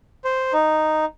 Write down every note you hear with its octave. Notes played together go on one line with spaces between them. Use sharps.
C5
D#4